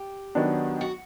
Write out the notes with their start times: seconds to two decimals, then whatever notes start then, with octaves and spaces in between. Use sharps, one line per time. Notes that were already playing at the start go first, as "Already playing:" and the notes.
Already playing: G4
0.35 D#3 F#3 B3 D4
0.81 F#4